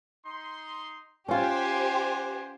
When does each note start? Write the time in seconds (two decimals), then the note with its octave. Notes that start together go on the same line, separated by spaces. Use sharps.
0.25 D#4 C6
1.28 C#4 F4 G4 C5 D5 F#5 G#5